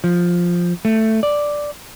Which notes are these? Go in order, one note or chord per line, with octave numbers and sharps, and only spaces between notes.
F3
A3
D5